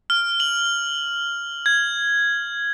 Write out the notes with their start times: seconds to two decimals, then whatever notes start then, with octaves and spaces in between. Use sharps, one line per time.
0.10 F6
0.40 F#7
1.66 G#6